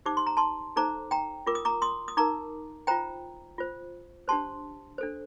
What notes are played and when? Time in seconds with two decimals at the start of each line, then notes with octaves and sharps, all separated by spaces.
0.06 D#4 G4 C5 D6
0.17 C6
0.27 A#5
0.37 A5 C6
0.76 D#4 A4 C5 A#5 D6
1.11 G5 A#5
1.47 F4 A#4 D6
1.55 D#6
1.65 A#5 D6
1.82 C6 D#6
2.08 D#6
2.17 D#4 A#4 A#5 D6
2.87 F4 C5 G5 A#5
3.58 F4 C5
4.28 D4 G4 C5 A5 C6
4.98 D4 A4 C5